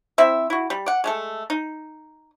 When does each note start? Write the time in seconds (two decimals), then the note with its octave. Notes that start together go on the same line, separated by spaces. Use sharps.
0.18 C4 E4 E5
0.50 E4 F#4
0.70 G3
0.86 D5 F#5
1.04 G#3 A3 A4
1.50 D#4